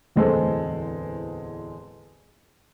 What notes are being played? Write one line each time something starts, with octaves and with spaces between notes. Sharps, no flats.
D1 E2 G#3 C4 A4 C5